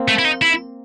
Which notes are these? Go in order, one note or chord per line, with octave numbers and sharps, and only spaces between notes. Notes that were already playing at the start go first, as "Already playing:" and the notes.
Already playing: A#3 C4
A3
E4
D#4
E4